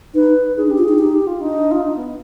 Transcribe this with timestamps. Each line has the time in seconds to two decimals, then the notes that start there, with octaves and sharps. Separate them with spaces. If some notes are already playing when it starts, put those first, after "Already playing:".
0.14 D#4 B4
0.57 D#4 G#4
0.67 D4
0.70 G4
0.78 F4
0.84 D#4 G#4
0.99 D#4 G4
1.13 G4
1.27 F4
1.41 D4 D#4
1.71 F4
1.83 D#4
1.97 B3